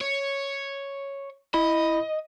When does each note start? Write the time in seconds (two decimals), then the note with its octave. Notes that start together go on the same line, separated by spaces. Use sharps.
0.01 C#5
1.54 E4 D#5 B5